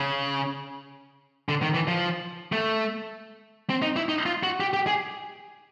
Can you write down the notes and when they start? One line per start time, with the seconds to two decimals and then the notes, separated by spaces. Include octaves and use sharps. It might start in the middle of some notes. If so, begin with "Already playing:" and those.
Already playing: C#3
1.49 D3
1.62 D#3
1.74 E3
1.88 F3
2.52 A3
3.70 C4
3.82 D#4
3.96 E4
4.09 D#4
4.26 F4
4.43 F#4
4.60 G4
4.74 G4
4.87 G#4